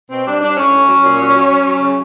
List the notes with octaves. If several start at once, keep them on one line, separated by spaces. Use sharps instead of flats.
B2 C4
G3 D4
G3 D4
A2 C#4
A2
F#3
A#2
F#3
F#3
F#3
F#3
C#3